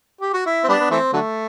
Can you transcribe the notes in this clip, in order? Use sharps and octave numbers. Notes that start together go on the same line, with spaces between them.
G4
F#4
E4
C4
G3 B3 D4
B3
E3 A3 C4
D3 F#3 A3